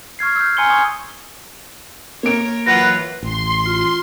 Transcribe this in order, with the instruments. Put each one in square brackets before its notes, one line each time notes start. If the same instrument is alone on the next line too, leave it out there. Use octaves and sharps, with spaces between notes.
[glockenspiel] C#6 F6 G#6 C7
E6 F6 G6
G#5 A#5 C6 F6 C#7 G7
C#6 D#6 G#6
[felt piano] A#3 D7 [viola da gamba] A#4 C#5
[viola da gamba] E3 F#3 F4 [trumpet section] B4 F#5 [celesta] A#6
[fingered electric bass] A1 [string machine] C6
[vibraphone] F4